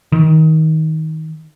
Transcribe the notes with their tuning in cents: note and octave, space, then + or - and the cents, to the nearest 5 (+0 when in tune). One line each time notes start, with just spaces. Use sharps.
D#3 +25